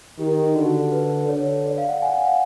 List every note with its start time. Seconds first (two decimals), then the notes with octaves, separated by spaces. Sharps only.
0.18 D#3 G4
0.55 D3 F#4
0.92 B4
1.28 D3 C#5
1.66 D5
1.78 F5
1.89 F#5
2.02 G#5
2.14 F#5
2.26 F5